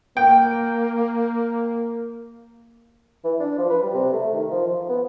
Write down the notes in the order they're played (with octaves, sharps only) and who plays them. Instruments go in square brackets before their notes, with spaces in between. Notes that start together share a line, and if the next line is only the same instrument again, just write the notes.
[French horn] A#3 [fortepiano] G5
[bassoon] E3
D4
F3
B4
G3
C3
A3
D#3
F3
F3
B3